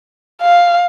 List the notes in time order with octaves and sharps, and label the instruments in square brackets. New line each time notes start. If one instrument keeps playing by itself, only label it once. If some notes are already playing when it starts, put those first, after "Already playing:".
[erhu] F5